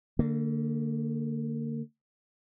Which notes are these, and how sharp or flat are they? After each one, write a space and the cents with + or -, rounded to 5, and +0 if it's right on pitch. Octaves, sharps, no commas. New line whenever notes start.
D3 +0 A#3 -30